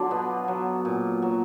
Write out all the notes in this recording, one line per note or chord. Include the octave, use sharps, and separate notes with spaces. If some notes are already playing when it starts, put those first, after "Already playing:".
Already playing: D3 F#3 D4 F4
B2 B3
F#3
A#2
F#3